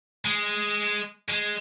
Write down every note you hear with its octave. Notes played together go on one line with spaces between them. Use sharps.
G#3
G#3